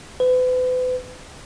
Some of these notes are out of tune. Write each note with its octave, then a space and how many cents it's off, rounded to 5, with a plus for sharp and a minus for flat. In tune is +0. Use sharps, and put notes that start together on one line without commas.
B4 +40